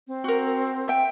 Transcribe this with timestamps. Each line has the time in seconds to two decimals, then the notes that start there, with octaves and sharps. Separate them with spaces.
0.07 C4
0.24 F#4 A#4
0.88 E5 G5